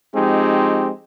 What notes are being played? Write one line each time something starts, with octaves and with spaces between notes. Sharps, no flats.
F3 G#3 C4 D#4 G4